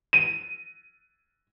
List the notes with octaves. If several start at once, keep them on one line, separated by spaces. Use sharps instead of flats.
D#7